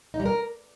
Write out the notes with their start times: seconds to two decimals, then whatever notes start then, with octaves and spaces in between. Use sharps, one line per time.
0.14 D#4
0.20 G3
0.26 A#4